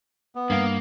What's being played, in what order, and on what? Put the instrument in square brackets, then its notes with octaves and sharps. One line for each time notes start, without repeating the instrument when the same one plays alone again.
[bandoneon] B3
[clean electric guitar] G2 F5 [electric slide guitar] A#3